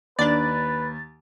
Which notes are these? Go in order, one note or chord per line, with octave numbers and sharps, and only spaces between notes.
D#2 D4 B4 D5 A6